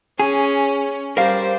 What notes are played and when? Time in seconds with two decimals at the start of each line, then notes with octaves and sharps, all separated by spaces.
0.19 C#4 G#4
1.17 G3 A#4 C5 F5